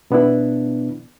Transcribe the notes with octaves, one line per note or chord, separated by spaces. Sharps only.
B2 B3 D4 E4